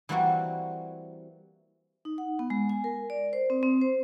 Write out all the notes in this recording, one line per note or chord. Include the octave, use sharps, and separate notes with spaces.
E3 G3 A#3 C4 F#4
D#4
F#5
B3
G#3
G#5
A#4
D5
C5
C4
C4
C5